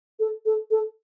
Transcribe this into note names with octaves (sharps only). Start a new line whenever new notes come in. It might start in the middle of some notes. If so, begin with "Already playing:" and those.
A4
A4
A4